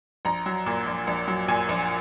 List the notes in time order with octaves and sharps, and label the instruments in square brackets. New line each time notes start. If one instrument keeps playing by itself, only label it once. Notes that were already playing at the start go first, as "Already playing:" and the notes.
[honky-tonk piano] A#1 A#5
F#3
A#2
A#1
A#1
F#3
A#2 G#5
A#1